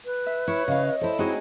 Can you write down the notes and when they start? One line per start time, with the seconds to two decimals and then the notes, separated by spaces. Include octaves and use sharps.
0.06 B4
0.26 E5
0.48 E4 C#5
0.68 C#3 D#5 F5
1.01 E4 A4 C5
1.19 G#3 C4 D#4 E4 F#4 G#4